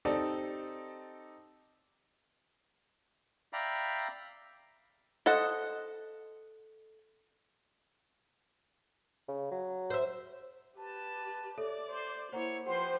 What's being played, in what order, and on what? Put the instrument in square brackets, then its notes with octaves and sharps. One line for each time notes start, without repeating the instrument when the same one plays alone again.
[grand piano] C4 D#4 G4 A4 D5
[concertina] D5 E5 F5 G5 A#5 B5
[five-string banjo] A4 C5 D#5 F#5
[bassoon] C#3
F#3
[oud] C5 E5
[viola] G4 B4 [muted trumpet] A5
[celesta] A4 C#5 E5 [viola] D5 D6
[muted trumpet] C5
[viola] A#3 E4 [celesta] C5 F#5 A#5 [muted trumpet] C#5
[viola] F3 B4 [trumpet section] G4 C5 [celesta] F#5 [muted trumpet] C6